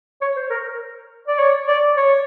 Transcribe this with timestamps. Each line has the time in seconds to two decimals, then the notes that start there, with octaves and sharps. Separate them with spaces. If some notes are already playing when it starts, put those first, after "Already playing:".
0.21 C#5
0.36 C5
0.50 A#4
1.28 D5
1.39 C#5
1.68 D5
1.97 C#5